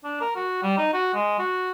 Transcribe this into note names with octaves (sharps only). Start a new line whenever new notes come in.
D4
A#4
F#4
G3
D#4
F#4
G#3
F#4